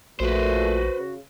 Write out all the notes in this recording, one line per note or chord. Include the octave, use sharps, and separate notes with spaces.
A#1 A#2 A3 F#4 B4 C5
C#3